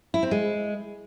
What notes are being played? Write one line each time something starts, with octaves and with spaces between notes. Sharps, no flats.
E4
C4
G#3